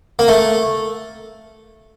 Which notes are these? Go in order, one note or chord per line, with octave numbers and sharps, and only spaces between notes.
A#3
A3